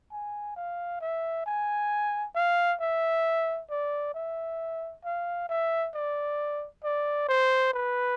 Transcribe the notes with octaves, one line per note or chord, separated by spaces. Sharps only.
G#5
F5
E5
G#5
F5
E5
D5
E5
F5
E5
D5
D5
C5
B4